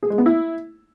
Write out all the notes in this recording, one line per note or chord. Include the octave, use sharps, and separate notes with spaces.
G#4
G#3
B3
E4